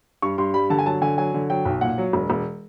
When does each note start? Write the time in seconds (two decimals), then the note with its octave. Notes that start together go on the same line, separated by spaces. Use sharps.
0.22 G2 C#6
0.38 G2 C6
0.54 G3 B5
0.70 D3 A5
0.79 G#5
0.86 F#3 A5
1.01 D3 G#5
1.18 F#3 G#5
1.34 D3
1.50 F#3 G5
1.65 B1
1.81 A#2 F#5
1.98 F#3
2.13 E1
2.30 E1